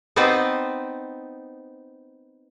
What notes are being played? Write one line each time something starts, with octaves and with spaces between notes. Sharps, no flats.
B3 C4 D#4 B4 C5 D5